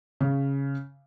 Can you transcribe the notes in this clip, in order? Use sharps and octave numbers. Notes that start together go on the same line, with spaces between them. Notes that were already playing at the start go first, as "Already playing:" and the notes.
C#3